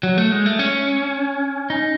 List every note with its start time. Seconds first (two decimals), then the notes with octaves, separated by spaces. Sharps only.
0.03 F#3
0.18 A3
0.32 G#3
0.46 A3
0.59 C#4
1.70 D#4